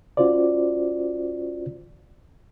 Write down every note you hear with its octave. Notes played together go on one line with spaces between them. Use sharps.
C#4 F4 F#4 C5 D5